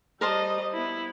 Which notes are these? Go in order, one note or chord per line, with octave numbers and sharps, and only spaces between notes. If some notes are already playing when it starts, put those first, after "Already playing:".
G3 A#4 C5 D#5 A5
B3 E4